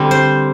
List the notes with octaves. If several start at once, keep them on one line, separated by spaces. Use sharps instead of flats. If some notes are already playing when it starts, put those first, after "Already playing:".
Already playing: D3 G3 C4
C5